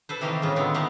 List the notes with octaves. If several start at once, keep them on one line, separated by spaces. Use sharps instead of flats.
A4 B4 C5
C3 D#3 E3 G4 D#5 F5
A2 C#3 G#3 F4
D3 D#3 G#3 B3 C4
A3 B3 D#4 G4 F5 F#5